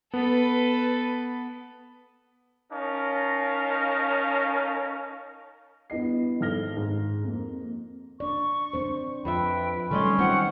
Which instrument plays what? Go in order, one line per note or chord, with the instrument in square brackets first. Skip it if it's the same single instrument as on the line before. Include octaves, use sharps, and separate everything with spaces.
[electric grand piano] B3 [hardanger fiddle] A4 B4
[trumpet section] C#4 D#4 A#4 F5 A5
[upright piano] G2 B3 E4 D#5 C7
G#1 A4 F6 A#6 G7
G#2
F2 A#3
[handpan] D4 D5 [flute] C#6
[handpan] C4 D4 C5
[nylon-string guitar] F2 F4 E5 [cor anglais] B4 [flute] G5
[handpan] D#3 F#3 G3 [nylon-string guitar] A3 D5 D#5 [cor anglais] C#4 [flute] C6
[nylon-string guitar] C4 [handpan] D#4 F4 [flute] F#5